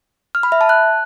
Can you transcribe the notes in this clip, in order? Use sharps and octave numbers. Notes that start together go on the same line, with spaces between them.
F6
B5
E5
A5
F#6